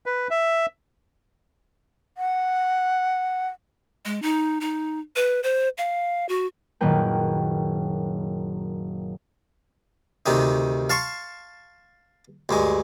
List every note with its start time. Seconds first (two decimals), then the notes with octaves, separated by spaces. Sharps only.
0.06 B4
0.30 E5
2.18 F#5
4.05 G#3
4.22 D#4
4.61 D#4
5.16 B4
5.43 C5
5.78 F5
6.29 F#4
6.81 F#1 A#2 D#3 A#3 B4 G5
10.26 D2 C3 D#3 D#4
10.90 F5 A5 C6 C#6
12.49 D2 G2 G#3